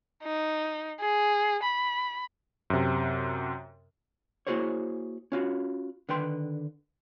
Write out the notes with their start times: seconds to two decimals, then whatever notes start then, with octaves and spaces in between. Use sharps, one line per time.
0.23 D#4
1.00 G#4
1.63 B5
2.70 F#2 C3
4.47 A#3 E4 F#4 G#4 C5 C#5
5.32 C#4 F4 F#4
6.09 D3 D#3 B4 G5 C6